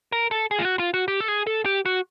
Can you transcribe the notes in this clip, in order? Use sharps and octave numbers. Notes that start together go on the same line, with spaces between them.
A#4
A4
G#4
F4
F#4
F4
F#4
G4
A4
G#4
A4
G4
F#4